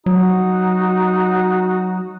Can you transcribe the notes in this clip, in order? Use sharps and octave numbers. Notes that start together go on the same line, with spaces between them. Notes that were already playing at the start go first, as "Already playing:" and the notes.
F#3 D#4 F#4